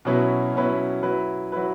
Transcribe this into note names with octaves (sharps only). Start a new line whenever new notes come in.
B2 F#3 C#4 E4 B4
B2 F#3 C#4 E4 B4
F#3 E4 B4
F#3 E4 B4